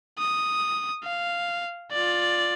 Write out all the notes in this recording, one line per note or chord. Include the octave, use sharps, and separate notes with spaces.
D#6
F5
F4 D5